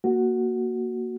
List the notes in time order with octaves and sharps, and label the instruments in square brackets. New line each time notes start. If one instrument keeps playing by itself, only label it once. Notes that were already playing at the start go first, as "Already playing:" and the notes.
[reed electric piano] A#3 F#4